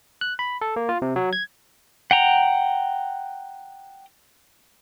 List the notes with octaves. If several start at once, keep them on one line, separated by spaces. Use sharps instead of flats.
F#6
B5
A4
A#3
F4
C3
F#3
G#6
F#5 G5 A#5